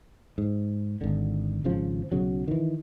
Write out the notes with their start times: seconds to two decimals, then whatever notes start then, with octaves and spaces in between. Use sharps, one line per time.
0.38 G#2
1.01 G#1 D3
1.64 G#1 C#3 F3
2.12 B1 C#3 F#3
2.48 D#3 E3